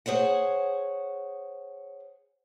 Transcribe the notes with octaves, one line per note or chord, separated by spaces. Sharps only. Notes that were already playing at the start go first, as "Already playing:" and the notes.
G#4 C5 C#5 F#5